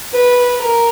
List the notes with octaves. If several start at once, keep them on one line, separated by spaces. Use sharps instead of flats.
B4
A#4